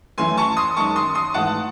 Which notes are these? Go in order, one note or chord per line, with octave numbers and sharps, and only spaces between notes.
F#2 E3 A3 G#5 C6
A5 C#6
C6 D#6
F#2 D#3 G#3 A5 C#6
C6 D#6
C6 D#6
G#2 E3 A3 F#5 A5